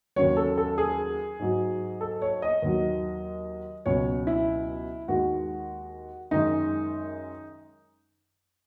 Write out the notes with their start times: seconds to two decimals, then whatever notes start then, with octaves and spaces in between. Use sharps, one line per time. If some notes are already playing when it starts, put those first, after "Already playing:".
0.16 D#2 C#3 F#3 C#5
0.37 A4
0.58 A4
0.78 G#4
1.39 G#2 F#3
2.01 A4
2.22 C#5
2.42 D#5
2.62 D#2 D#3 F#3
3.86 C#2 B2 F#3 C#5
4.27 E4
5.08 D#2 D#3 G#3 F#4
6.31 F#2 D#3 G#3 D#4